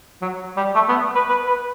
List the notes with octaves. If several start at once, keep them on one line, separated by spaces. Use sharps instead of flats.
F#3
G3
A3
B3
B4
B4
B4